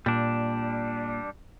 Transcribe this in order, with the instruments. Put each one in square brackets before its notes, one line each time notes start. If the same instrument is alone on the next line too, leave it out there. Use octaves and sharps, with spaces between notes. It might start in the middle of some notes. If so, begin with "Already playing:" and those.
[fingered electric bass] A#2 [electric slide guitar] G3 D4